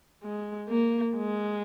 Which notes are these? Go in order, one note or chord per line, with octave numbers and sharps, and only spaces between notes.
G#3
A#3
G#3